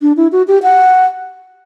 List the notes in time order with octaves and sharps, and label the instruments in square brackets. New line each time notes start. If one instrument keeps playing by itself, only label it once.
[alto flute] D4
E4
F#4
G4
F#5